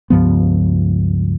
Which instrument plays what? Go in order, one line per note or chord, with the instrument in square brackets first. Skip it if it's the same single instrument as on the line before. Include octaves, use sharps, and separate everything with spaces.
[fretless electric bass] C#2 G2 F3 B3